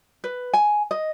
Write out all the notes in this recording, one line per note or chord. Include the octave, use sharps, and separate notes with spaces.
B4
G#5
D#5